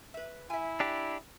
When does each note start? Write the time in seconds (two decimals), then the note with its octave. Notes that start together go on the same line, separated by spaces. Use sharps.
0.14 B4 E5
0.50 E4 E5 G#5
0.80 D4 G4